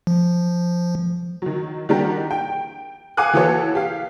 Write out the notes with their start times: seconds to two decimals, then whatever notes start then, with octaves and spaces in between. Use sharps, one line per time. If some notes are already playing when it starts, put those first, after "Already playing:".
0.07 F3
1.42 D#3 F#3
1.89 D#3 G3 D4 F#4 G4 A#4
2.31 G5
3.17 F5 F#5 G#5 D6 D#6 F#6
3.33 E3 A#3 F#4 A4 B4 C#5
3.75 G4 F5